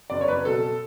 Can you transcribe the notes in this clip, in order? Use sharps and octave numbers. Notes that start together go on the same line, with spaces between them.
F#1 D5
C#5
F#1 B4
B2 A4